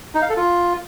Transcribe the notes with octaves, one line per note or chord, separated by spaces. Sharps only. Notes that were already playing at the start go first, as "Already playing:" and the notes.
D#4
F5
A4
F4